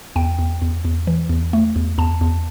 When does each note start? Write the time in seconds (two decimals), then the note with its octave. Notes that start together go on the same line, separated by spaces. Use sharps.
0.16 E2 G5
0.39 E2
0.62 E2
0.85 E2
1.07 E3
1.29 E2
1.53 A3
1.76 E2
1.98 E2 A5
2.21 E2